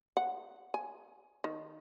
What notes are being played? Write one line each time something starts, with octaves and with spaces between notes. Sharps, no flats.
F#5
G#5
D#3